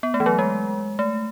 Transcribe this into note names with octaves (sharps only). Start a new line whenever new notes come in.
B3
A3
E3
F#3
G#3
A3